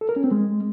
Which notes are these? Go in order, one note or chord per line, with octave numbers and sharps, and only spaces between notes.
A4
A#4
C#4
C4
G#3